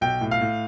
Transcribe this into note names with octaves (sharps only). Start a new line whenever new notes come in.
B1 G5
A2
F5
A2